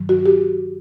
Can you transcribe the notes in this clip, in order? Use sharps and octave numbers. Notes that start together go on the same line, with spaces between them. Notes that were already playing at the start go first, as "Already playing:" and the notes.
Already playing: G2 D#3 F#3
F#4
G4